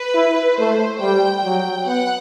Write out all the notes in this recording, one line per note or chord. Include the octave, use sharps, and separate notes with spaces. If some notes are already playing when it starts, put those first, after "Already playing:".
Already playing: B4
E4
A3 C5
G3 G5
F#3
B3 F#5